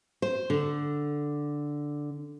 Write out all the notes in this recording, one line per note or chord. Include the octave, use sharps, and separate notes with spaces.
C5
D3